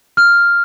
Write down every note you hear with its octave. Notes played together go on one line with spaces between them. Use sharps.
F6